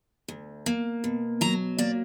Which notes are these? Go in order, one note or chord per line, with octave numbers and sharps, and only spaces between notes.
D2
A#3
B2
F#3 A#5
A#3 D5